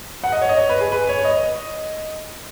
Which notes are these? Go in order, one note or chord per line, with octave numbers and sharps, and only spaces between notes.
F#5
D#5
C#5
D#5
C#5
B4
G#4
B4
C#5
C#5
D#5